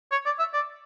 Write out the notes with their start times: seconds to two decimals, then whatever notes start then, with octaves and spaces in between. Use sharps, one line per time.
0.11 C#5
0.25 D5
0.39 E5
0.53 D5